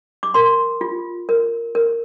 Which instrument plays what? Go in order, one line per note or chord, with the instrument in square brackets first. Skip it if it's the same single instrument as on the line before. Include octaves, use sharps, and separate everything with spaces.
[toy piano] D6
A#4 C6
F4
A#4
A#4